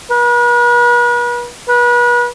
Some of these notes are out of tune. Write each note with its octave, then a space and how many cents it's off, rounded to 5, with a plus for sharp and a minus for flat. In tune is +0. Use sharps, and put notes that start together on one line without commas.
B4 -40
B4 -35